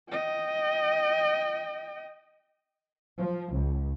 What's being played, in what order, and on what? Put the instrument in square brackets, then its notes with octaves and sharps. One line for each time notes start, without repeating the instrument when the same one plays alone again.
[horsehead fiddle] D#5 G5
[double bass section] F3
C#2